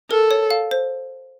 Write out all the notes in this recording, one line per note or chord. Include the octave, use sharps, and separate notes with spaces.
A4 A#4
C#5
F5
C5